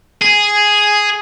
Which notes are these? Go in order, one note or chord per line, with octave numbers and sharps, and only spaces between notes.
G#4